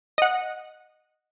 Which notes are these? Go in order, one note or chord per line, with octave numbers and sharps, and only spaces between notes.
D#5 F#5